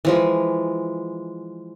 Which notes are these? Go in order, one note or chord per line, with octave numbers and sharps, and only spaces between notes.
E3 F3 G#3